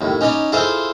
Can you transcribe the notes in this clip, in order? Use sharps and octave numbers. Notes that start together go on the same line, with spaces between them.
D#2 A2
C#4 D#4 C#5 D5 B5
E4 F4 G#4 A4 C5 F5